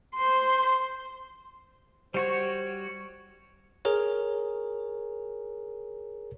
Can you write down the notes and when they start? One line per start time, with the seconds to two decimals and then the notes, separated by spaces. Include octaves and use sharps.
0.15 C5 C6
2.14 G3 F#4 C5 C#5
3.85 G#4 A#4 C#5